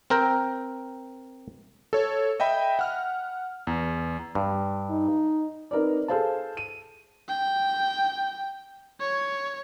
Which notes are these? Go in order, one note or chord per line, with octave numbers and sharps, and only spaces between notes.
C4 A#4 G5
A4 C#5
D#5 E5 G5 B5
F#5 F6
E2
G2
D#4
C4 D#4 A#4 B4 D5
G#4 A4 C5 F5 A5
D#7
G5
C#5